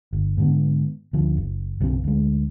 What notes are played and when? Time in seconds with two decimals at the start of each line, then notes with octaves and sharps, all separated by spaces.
0.13 G1
0.37 G#2 D3 B3
1.13 D2 F3
1.37 F#1
1.80 B1 F#2 C#3 C4
2.04 D2 G#3